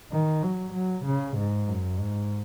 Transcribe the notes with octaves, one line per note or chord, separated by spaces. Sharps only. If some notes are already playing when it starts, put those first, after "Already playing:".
D#3
F#3
F#3
C#3
G#2
F#2
G#2